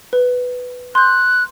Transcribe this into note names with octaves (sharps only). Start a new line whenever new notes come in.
B4
C6 F#6 G6